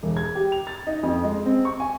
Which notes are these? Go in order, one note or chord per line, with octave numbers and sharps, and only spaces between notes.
E1
G#6
G4
F7
A6
D#4
F2
G#3
C4
C#6
G#5